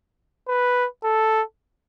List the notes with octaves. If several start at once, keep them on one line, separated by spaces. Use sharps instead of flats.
B4
A4